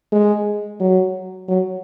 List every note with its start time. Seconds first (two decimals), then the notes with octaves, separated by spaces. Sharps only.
0.12 G#3
0.80 F#3
1.48 F#3